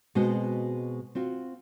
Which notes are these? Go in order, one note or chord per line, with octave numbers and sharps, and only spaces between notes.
B2 G#3 C4 F#4 C5
C4 F4 F#4